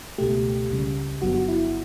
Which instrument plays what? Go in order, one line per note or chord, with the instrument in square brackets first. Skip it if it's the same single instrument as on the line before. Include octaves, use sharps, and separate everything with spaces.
[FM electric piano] C#2 B2 A3 G4
C#2 C#3 G3
G1 G2 F#3 B3 F#4
F#4
E4